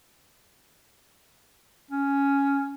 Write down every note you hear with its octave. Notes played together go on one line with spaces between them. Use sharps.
C#4